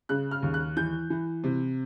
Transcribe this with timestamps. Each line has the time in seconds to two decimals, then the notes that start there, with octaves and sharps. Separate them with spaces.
0.09 C#3 F#6
0.31 F6
0.42 D#2
0.54 F#6
0.76 E3 G6
1.10 E3
1.44 C3